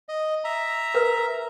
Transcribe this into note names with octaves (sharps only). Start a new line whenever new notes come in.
D#5
E5 A#5
A#4 B4